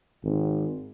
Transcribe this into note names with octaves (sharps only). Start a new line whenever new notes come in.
G#1